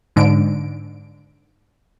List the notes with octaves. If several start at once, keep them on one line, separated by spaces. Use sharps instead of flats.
G#2 D3 D7